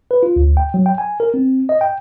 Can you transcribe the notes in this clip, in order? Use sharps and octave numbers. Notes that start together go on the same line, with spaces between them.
B4
F4
D2
G5
F#3
G5
G#5
A#4
C4
D#5
G5